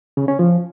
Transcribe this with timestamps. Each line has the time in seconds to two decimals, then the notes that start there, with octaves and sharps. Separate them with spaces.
0.17 C#3
0.28 C#4
0.39 F3